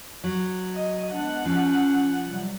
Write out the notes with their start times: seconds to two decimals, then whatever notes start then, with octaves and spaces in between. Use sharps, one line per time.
0.24 F#3
0.75 D#5
1.12 G#3 B3 D4 F#5
1.45 F3 C#4
2.25 C3 F#3 G3